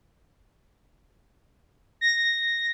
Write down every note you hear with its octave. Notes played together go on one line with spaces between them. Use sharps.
A#6